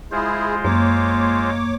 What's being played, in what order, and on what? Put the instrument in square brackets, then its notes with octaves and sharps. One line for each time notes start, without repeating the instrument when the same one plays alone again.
[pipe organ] G#3 F4 C5 [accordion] E4 G#4
[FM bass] F#2 [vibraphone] A#3 [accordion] C#5 D6